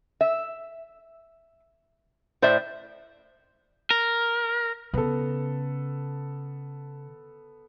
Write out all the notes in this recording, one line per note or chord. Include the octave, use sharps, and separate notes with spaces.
E5
A2 C5 D5 E5
A#4
C#3 B3 A4